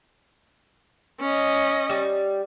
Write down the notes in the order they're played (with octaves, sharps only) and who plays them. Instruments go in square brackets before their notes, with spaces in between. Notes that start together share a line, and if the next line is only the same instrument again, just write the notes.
[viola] C#4 D#5
[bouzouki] G3